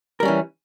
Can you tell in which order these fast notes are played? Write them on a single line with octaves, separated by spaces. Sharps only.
A#4 G3 C#4 E3